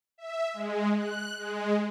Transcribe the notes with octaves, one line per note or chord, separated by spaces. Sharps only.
E5
G#3
F#6
G#3